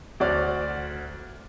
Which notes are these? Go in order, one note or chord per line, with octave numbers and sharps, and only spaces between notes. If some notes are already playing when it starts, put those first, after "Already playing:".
D2 F#4 C5 D5 F6